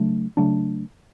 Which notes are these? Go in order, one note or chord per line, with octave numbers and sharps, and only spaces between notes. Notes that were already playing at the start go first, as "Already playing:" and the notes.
Already playing: C#3 F#3 A3 D4
C#3 F#3 A3 D4